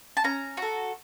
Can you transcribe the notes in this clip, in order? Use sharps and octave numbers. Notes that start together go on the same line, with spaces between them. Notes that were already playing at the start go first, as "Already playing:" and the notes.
A5
C#4 A#5
F#4 A4